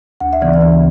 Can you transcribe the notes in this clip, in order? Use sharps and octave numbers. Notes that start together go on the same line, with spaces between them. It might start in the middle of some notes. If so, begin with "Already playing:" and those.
D2 F#5
E5
C#3 E3 B3 D5
D5
D2 E5